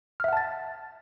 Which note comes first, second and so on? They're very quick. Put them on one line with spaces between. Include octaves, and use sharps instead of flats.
F6 E5 F#5 A5 A6